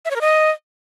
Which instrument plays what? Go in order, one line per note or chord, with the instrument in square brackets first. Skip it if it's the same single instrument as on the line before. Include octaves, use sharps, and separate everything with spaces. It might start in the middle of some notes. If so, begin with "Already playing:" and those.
[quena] E5
C#5
A#4
D#5